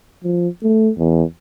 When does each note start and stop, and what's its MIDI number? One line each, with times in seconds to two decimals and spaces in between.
0.24 0.48 53
0.63 0.91 57
0.98 1.23 40